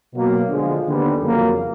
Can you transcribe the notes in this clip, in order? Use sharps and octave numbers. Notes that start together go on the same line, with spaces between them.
B2 F#3 A#3
D3 F3 G#3
D#2 D3 G3 B3
F2 C#3 F#3 A#3